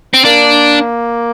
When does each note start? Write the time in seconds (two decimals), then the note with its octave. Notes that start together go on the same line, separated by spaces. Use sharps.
0.14 C4
0.25 A#3 D4